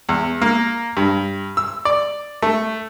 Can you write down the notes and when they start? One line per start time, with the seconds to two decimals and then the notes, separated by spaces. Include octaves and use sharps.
0.09 E2
0.42 A#3
0.97 G2
1.57 E6
1.85 D5
2.42 A3